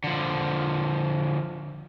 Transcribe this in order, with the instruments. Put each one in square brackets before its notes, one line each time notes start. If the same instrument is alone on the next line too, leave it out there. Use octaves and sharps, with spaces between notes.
[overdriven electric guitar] D3 F3